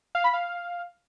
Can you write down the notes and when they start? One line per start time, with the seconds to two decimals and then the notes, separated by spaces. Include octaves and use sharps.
0.15 F5
0.24 B5
0.33 F5